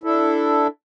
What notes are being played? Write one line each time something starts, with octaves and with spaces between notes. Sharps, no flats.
D4 E4 A4